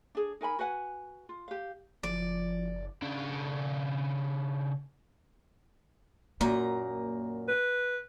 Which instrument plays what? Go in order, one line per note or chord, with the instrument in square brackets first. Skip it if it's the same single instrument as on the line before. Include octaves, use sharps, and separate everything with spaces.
[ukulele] D4 G#4
D#4 A#4 G#5 B5
F#4 B4 F#5 G#5
F4
G4 F5
[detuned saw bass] F#1 [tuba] F3 [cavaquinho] D5
[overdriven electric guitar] C#3 D4
[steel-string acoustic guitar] F#2 A#2 A#5 [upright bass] A#3
[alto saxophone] B4